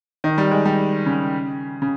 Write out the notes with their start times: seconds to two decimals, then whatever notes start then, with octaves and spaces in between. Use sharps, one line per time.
0.24 D#3
0.38 G3
0.51 G#3
0.65 G3
1.06 C#3
1.82 C#3